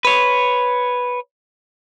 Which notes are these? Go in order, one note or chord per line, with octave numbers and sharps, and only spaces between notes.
B4 C#5